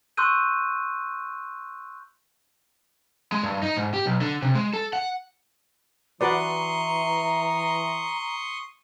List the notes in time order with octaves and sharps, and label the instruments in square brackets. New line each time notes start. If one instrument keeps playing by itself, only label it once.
[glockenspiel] C6 C#6 E6 F#6 G6 D#7
[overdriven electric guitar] G#3
G2
D#4
G#2
G4
B1
D3
C3
G#3
A4
F#5
[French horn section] E3 [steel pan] F#4 B4 D5 [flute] A#5 [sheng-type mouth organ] C6 C#6 D#6